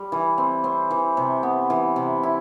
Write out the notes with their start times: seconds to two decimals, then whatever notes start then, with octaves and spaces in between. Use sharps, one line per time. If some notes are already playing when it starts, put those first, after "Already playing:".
Already playing: G3
0.12 E3
0.38 C4
0.64 C4
0.91 E3
1.17 C3
1.43 B3
1.70 E3
1.96 C3
2.23 E4